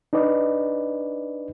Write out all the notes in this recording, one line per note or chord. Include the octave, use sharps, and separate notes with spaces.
D4 D#4 B4 D5 D#5